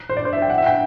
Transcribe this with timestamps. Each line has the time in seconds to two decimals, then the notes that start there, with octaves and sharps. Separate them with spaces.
0.09 C5
0.17 D5
0.25 C5
0.33 E5
0.42 G5
0.50 F#5
0.58 E5
0.66 G5